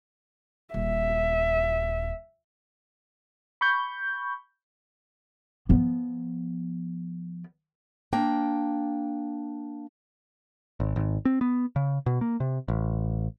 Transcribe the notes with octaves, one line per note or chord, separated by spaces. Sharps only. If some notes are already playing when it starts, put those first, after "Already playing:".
D#1 E5
B5 C#6 G6
F3 B3
A#3 D4 G5
G#1
G#1
C4
B3
C#3
B2
A#3
C3
A1